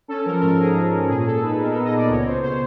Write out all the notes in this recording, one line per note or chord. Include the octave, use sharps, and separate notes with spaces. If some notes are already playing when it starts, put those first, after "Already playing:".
C#4 A4
F3 A#4
G#2 A#4
G#2 G#4
F3
C#4
A#2 G#4
A#2 A4
D#4 B4
B3 A#4
B3 A4
D#5
A#2 D5
C#2 C#5
B2 C5
B2 C5